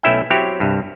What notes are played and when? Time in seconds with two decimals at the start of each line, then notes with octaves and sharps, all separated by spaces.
0.03 B1 A3 C#4 E4 E5 G5
0.30 F#3 C4 E4 G4 C#5
0.60 C2 G2